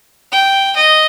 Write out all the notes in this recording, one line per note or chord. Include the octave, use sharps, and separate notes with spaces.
G5
D#5